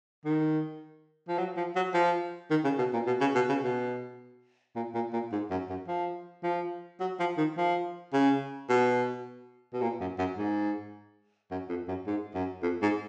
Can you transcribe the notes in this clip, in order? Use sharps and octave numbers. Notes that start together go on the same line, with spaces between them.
D#3
F3
F#3
F3
F#3
F3
D#3
C#3
B2
A#2
B2
C#3
B2
C#3
B2
A#2
A#2
A#2
G#2
F#2
F#2
F3
F3
F#3
F3
D#3
F3
C#3
B2
B2
A#2
F#2
F#2
G#2
F#2
F2
F#2
G#2
F#2
F2
G#2